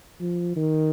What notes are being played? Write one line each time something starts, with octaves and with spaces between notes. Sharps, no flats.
F3
D#3